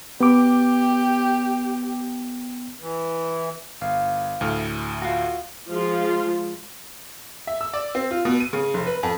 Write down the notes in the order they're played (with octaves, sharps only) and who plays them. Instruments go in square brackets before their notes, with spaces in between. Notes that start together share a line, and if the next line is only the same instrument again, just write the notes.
[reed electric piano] B3 D6 [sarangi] G4
[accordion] E3
[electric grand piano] G1 [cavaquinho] F5
[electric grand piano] D2 A2 F6
[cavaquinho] F4 F#4
[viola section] F3 G#3 F4
[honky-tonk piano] E5
E6
D5
C4
F4
B2
D#7
C#3
F1
B4
F2